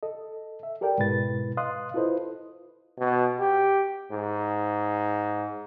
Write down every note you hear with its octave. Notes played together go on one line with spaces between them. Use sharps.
A4 D#5
E5
G4 A4 A#4 D5 G5
G#2 B2 G#3 E4 B4 A6
B4 D#5 F5 C6 D#6 F#6
E4 F4 A4 B4 C5 D#5
B2
G4
G#2